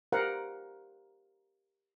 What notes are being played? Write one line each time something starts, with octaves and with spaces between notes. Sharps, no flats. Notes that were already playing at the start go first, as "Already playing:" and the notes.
G4 A#4 C5 F5 F#5